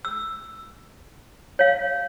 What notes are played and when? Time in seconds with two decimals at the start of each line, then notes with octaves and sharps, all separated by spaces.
0.05 E6
1.59 C#5 F5